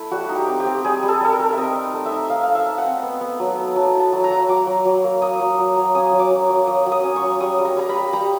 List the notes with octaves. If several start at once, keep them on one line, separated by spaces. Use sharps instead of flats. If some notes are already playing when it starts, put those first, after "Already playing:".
Already playing: A3 E4
G3 F#4
D#4
G4
C4
G4
C4
G3 G#4
G3
A4
G3 A4
A#4
G3
C4 D#5 E5
D#4
A3
E5
D#4
D#4 F5
A3 F5
E5
A3
F#5
C4
B3
B3
F#3
B3
F#3 A5
E4
A5
F#3
A#5
F#3
F#3 D6
F#3
F#3
A#3
A#3 D#6
F#3
F#3
F#3
C#4 D#6
F#3
D6
F#3
F#3
F#3 D#6
F#3
D#6
C#4
C#6
F#3
G3 D#6
G3
A#5
G3 A#5
B5
G3
G3 A#5